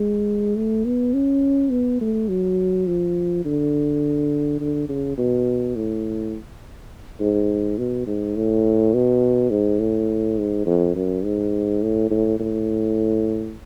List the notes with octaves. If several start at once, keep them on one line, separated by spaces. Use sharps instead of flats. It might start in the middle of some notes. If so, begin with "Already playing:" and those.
Already playing: G#3
A3
B3
C#4
B3
A3
F#3
F3
D3
D3
C#3
B2
A2
G#2
B2
G#2
A2
B2
G#2
A2
G#2
F2
F#2
G#2
A2
A2
A2